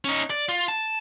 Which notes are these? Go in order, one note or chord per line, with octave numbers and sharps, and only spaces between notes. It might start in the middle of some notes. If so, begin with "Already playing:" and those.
C#4 D#4
D5
F4
A5